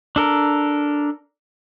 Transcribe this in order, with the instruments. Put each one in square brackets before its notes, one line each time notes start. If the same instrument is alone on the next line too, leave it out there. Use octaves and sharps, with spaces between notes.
[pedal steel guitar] D4 A4 A#4